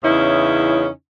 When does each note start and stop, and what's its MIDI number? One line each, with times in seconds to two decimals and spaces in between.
0.04 0.87 40
0.04 0.87 49
0.04 0.87 61
0.04 0.87 63
0.04 0.87 64